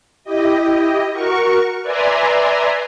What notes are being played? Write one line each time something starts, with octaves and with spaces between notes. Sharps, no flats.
E4 G4 D#5
F#4 A#4 C#6
B4 D5 E5 G#5 A#5 C6